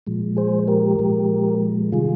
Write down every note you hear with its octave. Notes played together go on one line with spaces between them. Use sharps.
A#2 F3 G#3
G#4 C5
G4 A#4
A#2 F3 G#3
C3 D#3 G3 F4 G#4